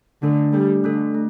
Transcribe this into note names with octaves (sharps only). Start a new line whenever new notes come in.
D3 A3 D4 A4
G3 A3 D4 A4
D3 A3 D4 A4
A3